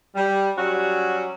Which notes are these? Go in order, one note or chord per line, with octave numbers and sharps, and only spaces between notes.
G3
F#3 G3 C#4 F#4